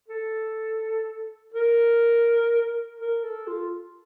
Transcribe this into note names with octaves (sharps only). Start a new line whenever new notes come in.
A4
A#4
A#4
A4
F4